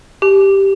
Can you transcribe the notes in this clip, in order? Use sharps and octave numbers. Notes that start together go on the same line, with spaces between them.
G4